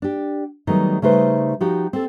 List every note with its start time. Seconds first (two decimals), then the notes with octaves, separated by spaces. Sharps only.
0.02 D4 G4
0.67 D#3 F#3 G3 A3 B3 D#4
1.02 C#3 G3 A3 D#4 B4 C5
1.60 F3 D#4 F#4 G4
1.93 C4 A4